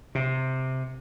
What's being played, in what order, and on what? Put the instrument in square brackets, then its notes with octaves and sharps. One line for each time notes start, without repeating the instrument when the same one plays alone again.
[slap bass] C3